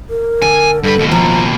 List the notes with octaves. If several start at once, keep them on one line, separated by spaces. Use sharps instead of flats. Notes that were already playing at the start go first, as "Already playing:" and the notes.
A#4
D3 G#5
G2 A4 B4
D#2 B2
F3 A#5